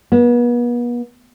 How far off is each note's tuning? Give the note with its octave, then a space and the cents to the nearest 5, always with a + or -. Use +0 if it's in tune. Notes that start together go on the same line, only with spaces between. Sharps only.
B3 -40